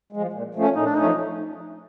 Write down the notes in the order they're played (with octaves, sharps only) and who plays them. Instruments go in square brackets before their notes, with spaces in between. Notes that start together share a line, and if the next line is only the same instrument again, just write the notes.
[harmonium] F3 G#3
A#2
F3 A3 C#4
[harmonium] A#2 [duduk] D#4
[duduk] D4
[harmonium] F3 A3 C#4 [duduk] D#4